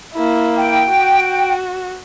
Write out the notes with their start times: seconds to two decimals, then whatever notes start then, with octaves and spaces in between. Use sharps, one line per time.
0.15 A#3 E4
0.57 G5
0.87 F#4